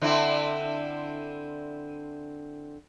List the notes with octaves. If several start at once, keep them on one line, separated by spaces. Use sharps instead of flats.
D3 C4 E4